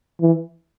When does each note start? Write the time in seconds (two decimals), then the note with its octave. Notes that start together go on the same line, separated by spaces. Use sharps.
0.21 E3